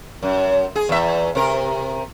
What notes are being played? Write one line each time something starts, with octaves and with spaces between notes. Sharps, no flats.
F#2
G#4
E2 E5
C3 A#4